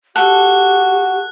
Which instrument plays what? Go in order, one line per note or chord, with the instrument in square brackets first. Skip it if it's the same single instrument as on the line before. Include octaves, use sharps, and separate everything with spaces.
[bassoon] F#4 [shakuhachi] G4 [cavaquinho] A4 [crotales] F#6